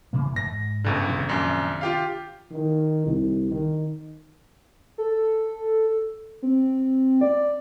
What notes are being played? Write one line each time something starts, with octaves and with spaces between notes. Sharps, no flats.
C3 E3 A#3
G#2 A#6
G1 C#2 G2 D3
C3 D#3 D4
A#1 F#2
F4 G4 F5
D#3
C2
D#3
A4
C4
D5